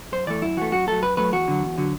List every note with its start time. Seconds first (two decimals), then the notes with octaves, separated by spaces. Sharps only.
0.12 F#2 C5
0.27 E3 A3 D5
0.42 F#2 E4
0.57 E3 A3 F#4
0.72 F#2 F#4
0.87 F#3 A3 A4
1.02 F#2 B4
1.17 F#3 A3 B4
1.32 E2 F#4
1.48 D3 F#3
1.63 E2
1.78 D3 F#3